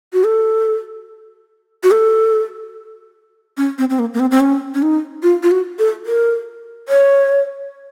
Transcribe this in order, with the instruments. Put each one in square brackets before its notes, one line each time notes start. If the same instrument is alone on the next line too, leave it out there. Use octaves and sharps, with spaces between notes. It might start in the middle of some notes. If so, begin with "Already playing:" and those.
[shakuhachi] F#4
A4
F#4
A4
C#4
C4
C4
A#3
A#3
C4
C4
C#4
C#4
D#4
F4
F4
F#4
A4
A#4
C#5